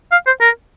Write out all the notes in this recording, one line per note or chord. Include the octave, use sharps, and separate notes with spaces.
F5
C5
A#4